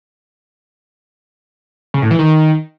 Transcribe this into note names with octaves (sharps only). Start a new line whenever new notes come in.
C#3
A2
E3
D#3